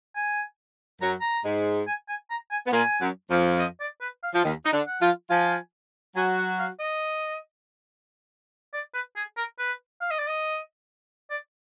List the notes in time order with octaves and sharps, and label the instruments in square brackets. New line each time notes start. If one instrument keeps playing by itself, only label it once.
[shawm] G#5
[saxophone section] F#2 F#3 [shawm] A#5
[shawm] A#5
[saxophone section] G#2 G#3
[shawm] G#5
G#5
A#5
G#5
[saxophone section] B3
[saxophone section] A#2 A#3 [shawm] G#5
[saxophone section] F#2 F#3
F2 F3
[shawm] D#5
D5
B4
F5
[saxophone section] F3
D#2 D#3
D#4
D3 D4
[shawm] F#5
[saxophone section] F3 F4
[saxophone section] F3 F4 [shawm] G#5
[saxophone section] F#3 F#4 [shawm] G#5
[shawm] F#5
F5
D#5
D5
B4
G#4
A#4
B4
F5
D#5
D5
D#5
D5